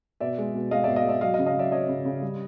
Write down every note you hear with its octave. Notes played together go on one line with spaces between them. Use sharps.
B2 D5 E5
G#3
B2
G#3 D#5 F5
B2 D5 E5
D#5 F5
G#3 D5 E5
F#3 D#5 F5
D#5 F5
C#3
D#5 F5
F#3 D5 E5
F#3 C#5 D#5
C#3
C#3
G3